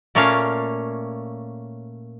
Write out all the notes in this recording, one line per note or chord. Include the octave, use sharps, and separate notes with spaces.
A#2 A3 A#3 C#4 C#5 F5